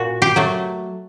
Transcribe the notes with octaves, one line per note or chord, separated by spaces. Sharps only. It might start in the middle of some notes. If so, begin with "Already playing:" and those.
Already playing: A#2 F#4
G4
F#3 A3